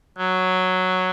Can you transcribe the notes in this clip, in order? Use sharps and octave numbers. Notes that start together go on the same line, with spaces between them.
F#3